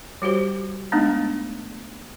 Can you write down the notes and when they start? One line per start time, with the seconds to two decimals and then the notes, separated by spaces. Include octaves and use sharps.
0.22 G3 F#4 G4 C5
0.92 G#3 A3 B3 D4 D#4